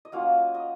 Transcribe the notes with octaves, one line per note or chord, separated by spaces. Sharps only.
D#5
F#3 A#3 C#4 F4 F5
D#5